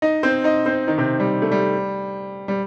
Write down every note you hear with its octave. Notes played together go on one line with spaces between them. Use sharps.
D#4 D#5
C4 C5
D#4 D#5
C4 C5
D#3 D#4
C3 C4
G3
A3
G3
G3